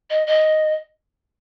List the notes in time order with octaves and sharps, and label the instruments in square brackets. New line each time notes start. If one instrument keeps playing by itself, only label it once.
[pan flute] D#5
D#5